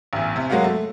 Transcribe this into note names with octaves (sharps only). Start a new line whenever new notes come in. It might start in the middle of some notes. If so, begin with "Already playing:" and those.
A1 E2
C3
F#3 G#3 A#3 F#4 F5
A3